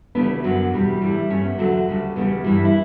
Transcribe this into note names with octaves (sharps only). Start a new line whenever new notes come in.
D2 C#3 E3 G3 B3 D4
F#2 D3 F#3
E2 B2 G3
A2 E3 G3
G2 E3 G3 A3 C#4
B3
E2 D3 F#3 A3
D2 C#3 G3
E2 C#3 G3 B3
G2 E3 G3
E4